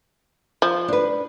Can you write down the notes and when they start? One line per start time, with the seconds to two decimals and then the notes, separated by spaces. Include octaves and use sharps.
0.62 F3
0.88 D4 B4